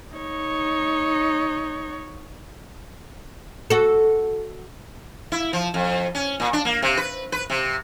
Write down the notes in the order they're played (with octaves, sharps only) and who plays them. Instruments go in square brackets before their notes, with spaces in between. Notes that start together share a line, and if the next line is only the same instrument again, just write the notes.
[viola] D#4 C#5
[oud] F#4 A4
[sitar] E4
F3
F2
C#4
A#2
D4
A#3
C3
B4
B4
C3